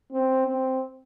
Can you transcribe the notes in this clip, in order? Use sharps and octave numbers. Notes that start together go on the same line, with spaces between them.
C4
C4